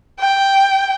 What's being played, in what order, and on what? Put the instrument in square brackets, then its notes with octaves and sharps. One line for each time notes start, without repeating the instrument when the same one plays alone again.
[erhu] G5